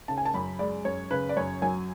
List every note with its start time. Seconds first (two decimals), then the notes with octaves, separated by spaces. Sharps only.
0.08 C#3 A5
0.18 G#5
0.25 A5
0.34 F#2 B5
0.59 G#3 D5
0.85 F#2 C#5
1.11 C#3 B4
1.29 D5
1.37 F#2 C#5
1.62 F#3 G#5